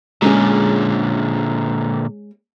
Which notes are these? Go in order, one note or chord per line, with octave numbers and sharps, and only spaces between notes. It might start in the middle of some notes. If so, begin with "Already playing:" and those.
A#2 D3 G#3 C#4 G#4